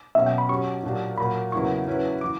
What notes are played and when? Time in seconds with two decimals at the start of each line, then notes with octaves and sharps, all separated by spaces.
0.15 B2 F#3 C#4 E5
0.26 G5
0.38 B5
0.49 F#3 C#4 G4 C#6
0.83 A#2 F#3 A#3 D4 G4
1.18 A#2 F#3 A#3 B5
1.52 E2 C#3 F#3 A#3 E4 C#6
1.88 F#3 C#4 E4 B4
2.21 E3 D6